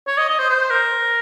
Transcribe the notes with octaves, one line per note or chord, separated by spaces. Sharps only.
C#5
D#5
D#5
C5
C5
A#4